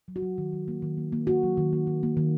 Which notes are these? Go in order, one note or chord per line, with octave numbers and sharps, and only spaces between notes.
F#3
F#4
F#3
D#3
F#3
A#3
D#3
A#3
A#3
D#3 F#4
F#3
D#3
A#3
D#3
A#3
D#3